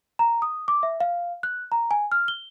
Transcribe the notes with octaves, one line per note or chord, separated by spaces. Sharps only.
A#5
D#6
D6
E5
F5
F#6
A#5
G#5
F6
G7